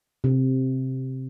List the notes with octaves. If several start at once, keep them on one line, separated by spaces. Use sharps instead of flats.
C3